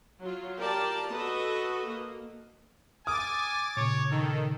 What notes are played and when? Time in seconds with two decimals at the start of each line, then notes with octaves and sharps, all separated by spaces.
0.21 F#3 F4
0.58 F4 G4 A#4 D5 A5
1.13 F#4 A4 B4 D#5
1.88 A#3
3.07 G#5 D6 D#6 F6 A6
3.77 A#2 C#3 C#5
4.11 D#3 A4